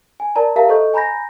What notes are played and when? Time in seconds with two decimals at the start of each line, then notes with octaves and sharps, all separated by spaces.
0.20 G#5
0.35 A#4 D5 A5 A#5
0.56 G4 A#4 E5 F5 A5 A#5
0.69 A4 C5 D#5 C#6 G6
0.94 G#5 A#5 B5 G6 A#6